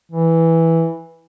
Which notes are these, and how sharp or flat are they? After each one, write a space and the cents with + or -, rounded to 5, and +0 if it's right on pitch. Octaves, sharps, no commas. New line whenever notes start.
E3 -5